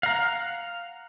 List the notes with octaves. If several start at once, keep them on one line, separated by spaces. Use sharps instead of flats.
F5 F#5 A#5